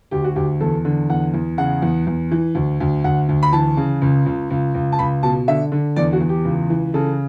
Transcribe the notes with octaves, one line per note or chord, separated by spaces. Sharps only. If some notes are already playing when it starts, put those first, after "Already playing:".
D2 G4
F#4
D2 G4
E2 A4
D3
E2 F#5
E2
C#3 F#5
E2
E2
E3
D2
D2
D2 F#5
D2
B5
E3 A5
C#3
C#2
C#2
C#2
C#2
A5
C#2 B5
B2 A5
D3 E5
D3
E2 D5
F#4
E2
G4
C#2
E3
C#3 A4